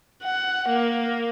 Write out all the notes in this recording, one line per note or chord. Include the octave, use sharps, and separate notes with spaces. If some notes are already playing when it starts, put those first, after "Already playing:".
F#5
A#3